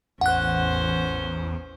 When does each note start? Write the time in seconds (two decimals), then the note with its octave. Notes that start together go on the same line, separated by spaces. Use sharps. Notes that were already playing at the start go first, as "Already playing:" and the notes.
0.21 A1 E2 C#4 C5 F#5 F#6